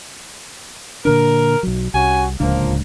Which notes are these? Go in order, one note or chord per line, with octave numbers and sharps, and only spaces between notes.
A#2 D3 D4 A#4
B1 F#3
C2 C#4 F#4 G#5
D1 C#2 F3 A#3 D4